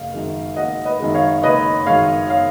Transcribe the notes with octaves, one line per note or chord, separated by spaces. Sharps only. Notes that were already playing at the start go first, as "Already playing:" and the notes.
Already playing: F#1 F5
F#2 D#3 G#3
F#1 D#5 F#5
B4 D#5
F#2 D#3 G#3
C#5 F5
F#1 B4 D#5
F#2 D#3 G#3 C#5 F5
C#5 F5